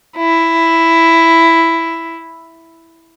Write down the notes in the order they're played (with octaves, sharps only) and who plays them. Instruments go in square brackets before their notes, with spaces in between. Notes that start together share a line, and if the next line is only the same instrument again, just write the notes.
[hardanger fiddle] E4